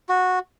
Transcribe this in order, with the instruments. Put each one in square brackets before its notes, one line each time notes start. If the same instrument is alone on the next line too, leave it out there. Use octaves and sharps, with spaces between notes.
[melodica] F#4